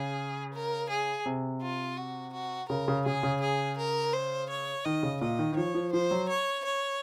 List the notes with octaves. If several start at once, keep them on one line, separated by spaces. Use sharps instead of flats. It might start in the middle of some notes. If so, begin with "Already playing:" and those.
Already playing: C#3 G#4
A#4
G#4
C3
F4
F#4
F#4
C#3 A#4
C#3
C#3 G#4
C#3
G#4
A#4
C5
C#5
D#3 D#5
C#3
A#2 D#5
D#3
D#3
F3 C#5
F3
F3 C5
F#3
C#5
C#5